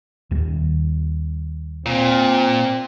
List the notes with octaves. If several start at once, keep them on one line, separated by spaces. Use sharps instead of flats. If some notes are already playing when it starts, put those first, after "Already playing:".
D#2 D#3 G3
A#2 C4